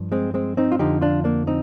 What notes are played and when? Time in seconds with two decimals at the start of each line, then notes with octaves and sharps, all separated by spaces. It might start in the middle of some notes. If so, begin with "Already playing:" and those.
Already playing: G2 F3
0.12 G#3 C4
0.34 G#3 C4
0.57 C4 D#4
0.72 F4
0.79 F2 D3 F3 D#4 G4
1.01 D4 F4
1.24 A#3 D4
1.47 C4 D#4